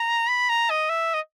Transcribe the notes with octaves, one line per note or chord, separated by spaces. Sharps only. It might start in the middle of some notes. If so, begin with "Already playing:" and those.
Already playing: A#5
B5
A#5
D#5
E5
D#5